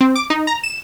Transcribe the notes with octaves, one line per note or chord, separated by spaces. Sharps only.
C4
D6
D#4
A#5
E7